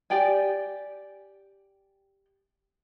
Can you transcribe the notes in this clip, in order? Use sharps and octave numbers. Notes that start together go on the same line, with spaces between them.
G4 D5 G5 G#5